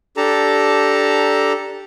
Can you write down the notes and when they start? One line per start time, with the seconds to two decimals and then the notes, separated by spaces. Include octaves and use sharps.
0.17 D4 G4 A4 A5 A#5